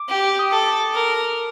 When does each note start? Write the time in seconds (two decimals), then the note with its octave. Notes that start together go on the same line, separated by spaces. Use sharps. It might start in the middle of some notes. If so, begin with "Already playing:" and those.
Already playing: D6
0.09 G4
0.39 D#6
0.51 A4 D6
0.94 A#4